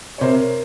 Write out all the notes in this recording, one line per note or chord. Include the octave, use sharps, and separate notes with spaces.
C#5
C3 A#4 C5